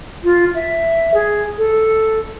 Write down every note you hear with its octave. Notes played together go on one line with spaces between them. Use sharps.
F4
E5
G#4
A4